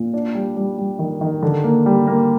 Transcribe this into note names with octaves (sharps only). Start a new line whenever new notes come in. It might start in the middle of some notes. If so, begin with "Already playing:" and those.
Already playing: A#2
D4
G3
G3
G3
D#3
D#3
D3
A#3
G3
A#3